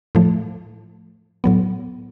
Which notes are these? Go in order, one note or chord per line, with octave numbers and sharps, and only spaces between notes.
A2 F3 A3
A2 F#3 B3